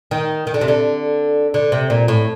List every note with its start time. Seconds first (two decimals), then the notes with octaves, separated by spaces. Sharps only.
0.11 D#3
0.47 D#3
0.54 D3
0.61 C3
0.68 D3
1.54 D3
1.72 C3
1.90 A#2
2.08 A2